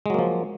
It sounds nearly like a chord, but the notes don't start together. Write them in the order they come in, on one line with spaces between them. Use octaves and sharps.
G#3 F#3 A#3 F3